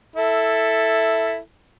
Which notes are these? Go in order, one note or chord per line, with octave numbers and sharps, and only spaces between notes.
E4 A4